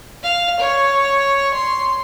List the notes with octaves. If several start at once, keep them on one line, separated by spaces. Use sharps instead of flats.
F5
C#5
C6